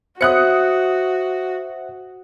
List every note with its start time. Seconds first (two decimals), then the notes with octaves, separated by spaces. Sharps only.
0.21 F#4 C5 E5 F#5 D#6 F#6 C#7